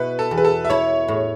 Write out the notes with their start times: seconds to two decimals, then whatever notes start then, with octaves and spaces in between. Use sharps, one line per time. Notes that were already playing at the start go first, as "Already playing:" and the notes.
Already playing: B2 E4 B4
0.19 A4
0.31 E2
0.38 B4
0.45 A4
0.65 E5
0.70 E4 C#5
1.08 A2